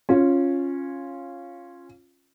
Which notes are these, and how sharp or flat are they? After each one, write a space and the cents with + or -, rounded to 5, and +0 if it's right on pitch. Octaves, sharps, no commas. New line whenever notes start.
C#4 -10 F4 +0